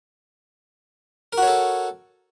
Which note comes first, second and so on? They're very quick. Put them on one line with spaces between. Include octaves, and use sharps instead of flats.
A#4 F#4 C#5 A4